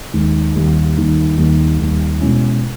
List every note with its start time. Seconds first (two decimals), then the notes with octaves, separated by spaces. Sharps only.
0.14 D#2 D#3 G#3
0.55 D#2 D#3 G3 A#3
0.96 D#2 D#3 G3 A#3
1.37 D#2 D#3 G3 A#3
1.79 D#2 D#3 G3 A#3
2.20 B2 G#3 C#4 E4